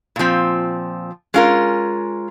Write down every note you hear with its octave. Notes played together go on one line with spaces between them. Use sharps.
A#2 F3 C4
G#3 C#4 F4 A#4